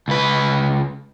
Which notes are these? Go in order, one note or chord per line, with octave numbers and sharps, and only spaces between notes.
C#2 B4